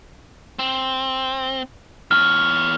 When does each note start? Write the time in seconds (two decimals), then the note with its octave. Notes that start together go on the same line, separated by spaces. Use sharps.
0.59 C4
2.11 E2 C#5 F6